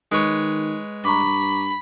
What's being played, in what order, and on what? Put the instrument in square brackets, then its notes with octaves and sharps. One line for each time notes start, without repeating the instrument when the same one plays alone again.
[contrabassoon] D#3 [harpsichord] G#3 B4 C#5
[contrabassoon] G2 [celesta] A#5 C#6 D6 [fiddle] B5